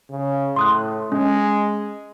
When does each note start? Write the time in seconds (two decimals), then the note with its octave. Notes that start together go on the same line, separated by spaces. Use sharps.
0.10 C#3
0.56 A2 C6 D#6 F#6
1.12 G#3 C#4